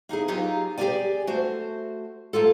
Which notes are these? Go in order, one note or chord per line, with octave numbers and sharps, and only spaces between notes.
A#3 D#4 E4 G#4
F#3 A#3 D#4 F4 G4 G#4
G4 G#4 A#4 C#5 D5 G#5
A3 F#4 C5
A3 A#3 F4 A4